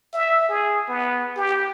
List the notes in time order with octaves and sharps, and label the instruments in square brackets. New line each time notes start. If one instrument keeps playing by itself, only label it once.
[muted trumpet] E5
G#4
B3
G4